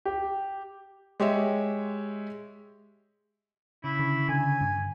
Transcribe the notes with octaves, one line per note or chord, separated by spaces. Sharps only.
G4
G#3 G4 C#5 E5
C#3 E4
D3
D3 G#5
G2